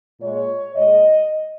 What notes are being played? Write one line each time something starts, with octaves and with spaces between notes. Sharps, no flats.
A#2 G#3 C#5
A#2 G#3 D#5